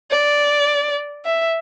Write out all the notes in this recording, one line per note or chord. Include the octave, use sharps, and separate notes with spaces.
D5
E5